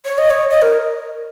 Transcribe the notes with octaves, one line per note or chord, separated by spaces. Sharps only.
C#5
D#5
C#5
D#5
A#4